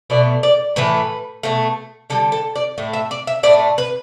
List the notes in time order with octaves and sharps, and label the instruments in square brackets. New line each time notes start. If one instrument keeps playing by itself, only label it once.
[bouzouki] B2 A3 D5
D5
A2 E3 A3 B4
B2 A3
D3 G3 A4
A4
D5
A2 A3
E5
D5
E5
A2 A3 D5
B4